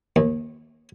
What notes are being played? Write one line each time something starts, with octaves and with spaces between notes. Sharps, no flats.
D#2